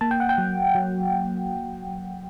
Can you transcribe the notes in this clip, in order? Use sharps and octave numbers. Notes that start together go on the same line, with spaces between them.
A#3 A5
G5
F#5
G5
F#3
F#3